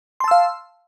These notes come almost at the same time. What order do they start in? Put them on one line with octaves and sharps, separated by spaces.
C6 A5 E6 F5